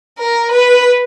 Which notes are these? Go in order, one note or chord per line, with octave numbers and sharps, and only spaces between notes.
A#4
B4